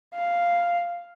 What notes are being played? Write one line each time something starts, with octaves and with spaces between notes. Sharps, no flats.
F5